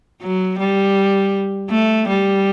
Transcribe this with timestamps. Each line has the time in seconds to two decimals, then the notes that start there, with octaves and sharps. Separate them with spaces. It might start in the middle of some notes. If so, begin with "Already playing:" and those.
0.22 F#3
0.59 G3
1.70 A3
2.08 G3